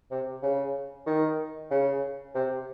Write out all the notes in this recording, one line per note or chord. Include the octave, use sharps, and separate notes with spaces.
C3
C#3
D#3
C#3
C3